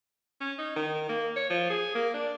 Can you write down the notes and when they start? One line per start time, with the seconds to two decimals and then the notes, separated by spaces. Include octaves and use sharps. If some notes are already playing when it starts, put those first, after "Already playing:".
0.41 C#4
0.58 D#4
0.76 D#3
1.09 A#3
1.36 C#5
1.50 F3
1.70 G#4
1.95 A#3
2.14 D4